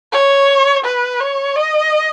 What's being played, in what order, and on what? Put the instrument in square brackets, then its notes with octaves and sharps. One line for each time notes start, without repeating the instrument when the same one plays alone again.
[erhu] C#5
B4
C#5
D#5